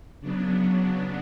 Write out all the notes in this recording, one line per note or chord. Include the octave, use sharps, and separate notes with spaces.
C#3 F#3 B3 D4
D4